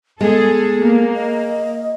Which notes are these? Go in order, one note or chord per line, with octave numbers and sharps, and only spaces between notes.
G#3 B3 G#4 A4
A#3
D#5